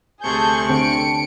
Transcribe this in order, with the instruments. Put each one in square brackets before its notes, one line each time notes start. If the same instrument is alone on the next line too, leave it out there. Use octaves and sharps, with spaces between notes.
[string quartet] D2 C3 C#6 [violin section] G#4 A4 G6 [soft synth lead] A5
[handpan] D3 C4 [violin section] C#7 D7